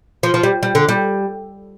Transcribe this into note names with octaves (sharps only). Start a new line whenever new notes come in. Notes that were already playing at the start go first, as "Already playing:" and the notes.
F3
F3
G3
G3
D3
G3